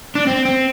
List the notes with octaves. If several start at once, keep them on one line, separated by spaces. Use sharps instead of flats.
D4
C4
C4